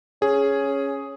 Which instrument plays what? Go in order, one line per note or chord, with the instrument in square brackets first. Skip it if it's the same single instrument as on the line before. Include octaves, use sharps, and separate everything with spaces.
[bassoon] C#4 [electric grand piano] G#4